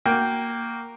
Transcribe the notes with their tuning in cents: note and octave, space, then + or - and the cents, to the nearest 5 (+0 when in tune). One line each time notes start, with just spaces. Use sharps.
A#3 +0 F#4 +0 G5 +0